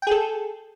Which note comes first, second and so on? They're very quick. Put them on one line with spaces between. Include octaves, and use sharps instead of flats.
G5 G#4 A4